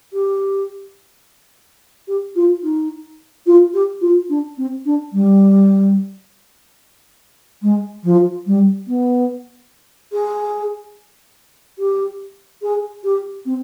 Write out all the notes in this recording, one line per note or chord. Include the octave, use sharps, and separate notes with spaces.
G4
G4
F4
D#4
F4
G4
F4
D4
C4
D4
G3
G#3
F3
G3
B3
G#4
G4
G#4
G4
C4